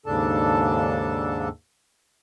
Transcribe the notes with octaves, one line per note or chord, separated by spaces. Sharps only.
D#2 G#2 C#3 D4 A4 A5